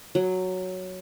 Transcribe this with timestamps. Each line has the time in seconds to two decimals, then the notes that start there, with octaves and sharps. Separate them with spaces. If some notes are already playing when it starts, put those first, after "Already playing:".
0.15 F#3